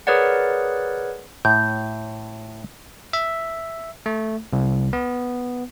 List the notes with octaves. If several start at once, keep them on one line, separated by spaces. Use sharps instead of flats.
G#4 A#4 B4 C#5 D5 F#5
A2 G6
E5
A3
C2
B3